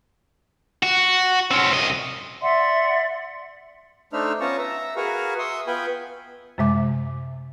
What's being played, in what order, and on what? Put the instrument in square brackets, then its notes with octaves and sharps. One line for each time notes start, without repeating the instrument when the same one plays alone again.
[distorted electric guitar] F#4
C4 C#4
C2 D#5
[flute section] D5 E5 F#5 C6
[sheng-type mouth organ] A3 D4 D#4 C5 E5 F6
B3 C#4 F4 A5 A#5 C#6
E5 A#5
F#4 G#4 A#4 B4 F5 C#6
E5 C6 C#6 D#6
B3 F4 B4 G5 G#5 B5
[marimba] F#2 C3 G#3 E5 D6